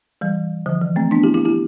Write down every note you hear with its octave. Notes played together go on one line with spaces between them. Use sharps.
E3 G3
D3 F3
E3
A3 C4
B3 D4
E4 G4
E4 G4
E4 G4